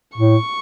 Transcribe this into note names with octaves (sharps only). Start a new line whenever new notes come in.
A2 C#6